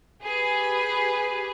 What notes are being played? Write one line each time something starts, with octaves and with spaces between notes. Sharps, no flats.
G4 G#4 B4